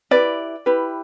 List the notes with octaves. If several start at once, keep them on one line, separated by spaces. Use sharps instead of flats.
E4 G4 B4 D5
E4 G4 B4